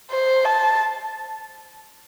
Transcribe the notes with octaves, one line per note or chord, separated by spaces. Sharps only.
C5
A5